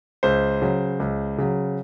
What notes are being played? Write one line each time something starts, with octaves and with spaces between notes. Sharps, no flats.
C#2 C5
C#3 F#3
C#2
C#3 F#3